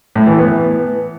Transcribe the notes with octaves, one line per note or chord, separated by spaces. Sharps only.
A2
E3
B3